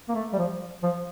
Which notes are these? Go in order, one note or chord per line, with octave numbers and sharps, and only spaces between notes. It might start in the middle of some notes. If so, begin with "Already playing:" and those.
A#3
A3
G3
F3
F3